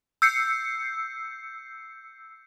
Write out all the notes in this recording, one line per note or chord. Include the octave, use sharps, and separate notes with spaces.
E6 G6 C7 C#7